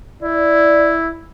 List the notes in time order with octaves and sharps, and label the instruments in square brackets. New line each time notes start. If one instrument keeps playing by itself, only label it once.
[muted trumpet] E4 [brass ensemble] D5